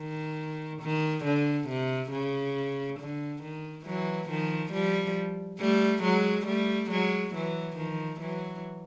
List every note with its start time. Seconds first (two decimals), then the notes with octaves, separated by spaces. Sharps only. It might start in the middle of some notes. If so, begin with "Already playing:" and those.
Already playing: D#3
0.81 D#3
1.25 D3
1.68 C3
2.11 C#3
2.99 D3
3.43 D#3
3.86 E3 F#3
4.29 D#3 F3
4.73 F3 G3
5.59 G3 A3
6.03 F#3 G#3
6.46 G3 A3
6.91 F#3 G#3
7.34 E3 F#3
7.77 D#3 F3
8.20 E3 F#3